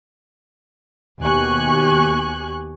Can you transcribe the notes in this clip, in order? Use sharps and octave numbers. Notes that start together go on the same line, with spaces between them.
D#2 B2 G4 G#5 C#6 F#6